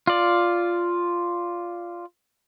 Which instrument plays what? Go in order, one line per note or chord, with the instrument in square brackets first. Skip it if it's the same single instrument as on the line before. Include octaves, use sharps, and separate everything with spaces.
[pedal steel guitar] F4 D5